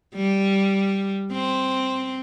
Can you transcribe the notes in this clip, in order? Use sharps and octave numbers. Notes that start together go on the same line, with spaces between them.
G3
C4